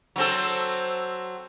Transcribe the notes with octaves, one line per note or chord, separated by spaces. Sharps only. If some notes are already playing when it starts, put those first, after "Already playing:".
F#3 C4 A4